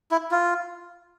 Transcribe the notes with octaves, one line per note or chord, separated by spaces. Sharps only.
E4
F4